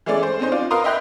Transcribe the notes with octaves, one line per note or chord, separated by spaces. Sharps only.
E3 G#3 A3 C#4 D5
C5
C4 C#4 D#4 C5
D4 F4
A#4 B4 F5 A#5 C6 D#6
D#5 E5 G5 C6 F#6 G6